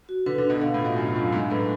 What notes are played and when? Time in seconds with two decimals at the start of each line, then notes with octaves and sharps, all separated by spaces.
0.09 F#4
0.26 D3 B4
0.38 D3
0.44 D4
0.50 B2
0.61 B2 F5
0.74 A2
0.79 F4
0.85 B2
0.97 F#2 D4
1.15 F#2 F5
1.32 G#2 D4
1.50 A2 B4